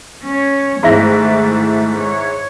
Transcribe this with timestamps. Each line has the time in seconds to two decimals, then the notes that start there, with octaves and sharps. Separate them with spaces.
0.24 C#4 C#5
0.83 G#2 D#3 A3 E4 A#6
2.00 C#5